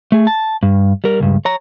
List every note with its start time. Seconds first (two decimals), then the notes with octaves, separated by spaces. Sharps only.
0.12 A3 G#4
0.27 A5
0.63 G2
1.04 G3 A#4
1.20 C#2 G2
1.45 C#5 A#5